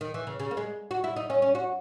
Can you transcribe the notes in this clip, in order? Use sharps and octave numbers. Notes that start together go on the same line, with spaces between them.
D#3
E3
C#3
C#3
A#3
G#3
F#4
E4
D#4
C#4
C#4
F#4